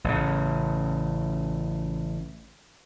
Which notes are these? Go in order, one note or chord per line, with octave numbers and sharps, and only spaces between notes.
A1 C#3